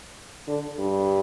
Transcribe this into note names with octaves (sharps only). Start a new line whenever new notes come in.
D3
G2